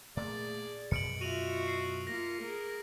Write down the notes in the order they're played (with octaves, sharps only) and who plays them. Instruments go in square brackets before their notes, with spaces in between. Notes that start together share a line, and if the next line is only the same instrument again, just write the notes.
[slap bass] A#2 A3 A#3 [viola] G#4 [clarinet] D5
[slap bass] F#2 B2 [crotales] C#7 D7 F#7
[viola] F4 E5 [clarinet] F#4 [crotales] D#7 F7 F#7
[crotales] C7
[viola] A#3 F4 [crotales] A#6
[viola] G#4 A#4